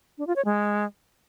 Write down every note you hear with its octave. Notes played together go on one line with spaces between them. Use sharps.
D4
F4
C#5
G#3